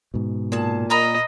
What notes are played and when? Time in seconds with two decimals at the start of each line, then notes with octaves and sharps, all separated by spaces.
0.14 G#2 B2
0.52 A#2 G#4 A5
0.90 A#4 D#5 A#5 B5